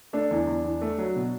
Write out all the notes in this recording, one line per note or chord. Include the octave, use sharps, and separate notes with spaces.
A3 D4
E2
E2
E2
A3
F#3
B2